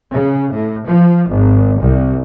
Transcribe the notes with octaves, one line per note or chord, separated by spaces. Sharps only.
C#3
A2
F3
G#1
C2